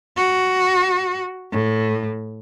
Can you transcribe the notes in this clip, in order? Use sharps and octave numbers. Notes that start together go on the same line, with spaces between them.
F#4
A2